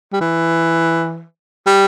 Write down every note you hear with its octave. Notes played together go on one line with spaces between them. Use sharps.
G3
E3
G3